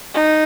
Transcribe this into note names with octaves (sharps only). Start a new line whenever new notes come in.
D#4